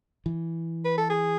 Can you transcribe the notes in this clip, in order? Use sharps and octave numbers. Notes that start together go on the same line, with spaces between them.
E3
B4
A4
G#4